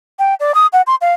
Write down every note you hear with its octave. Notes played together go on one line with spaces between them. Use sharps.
G5
D5
D#6
F#5
C6
F5